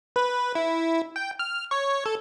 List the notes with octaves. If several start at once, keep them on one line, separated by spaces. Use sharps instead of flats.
B4
E4
G5
F6
C#5
A4